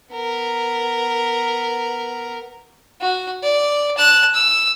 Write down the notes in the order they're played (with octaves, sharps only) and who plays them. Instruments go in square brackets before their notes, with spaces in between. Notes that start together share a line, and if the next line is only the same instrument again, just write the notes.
[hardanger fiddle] B3 A#4
[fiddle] F#4
D5
A5 F#6
E6